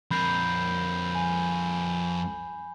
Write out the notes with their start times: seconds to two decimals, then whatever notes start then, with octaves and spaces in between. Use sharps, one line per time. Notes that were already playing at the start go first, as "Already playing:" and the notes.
0.11 F2 A#4 B5 G6 C7
1.15 G#5